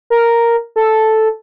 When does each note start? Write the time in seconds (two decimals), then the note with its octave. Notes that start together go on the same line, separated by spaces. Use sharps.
0.10 A#4
0.76 A4